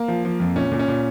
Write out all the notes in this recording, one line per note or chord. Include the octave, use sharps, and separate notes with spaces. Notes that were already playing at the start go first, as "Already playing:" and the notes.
Already playing: A#3
F3
F3
F2
A#2 C#4
A#2
C#4
A#2